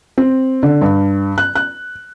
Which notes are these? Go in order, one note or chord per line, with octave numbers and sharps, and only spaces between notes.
C4
D3
G2
F#6
F#6